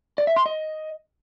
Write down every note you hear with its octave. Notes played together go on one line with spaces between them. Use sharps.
D5
E5
C6
D#5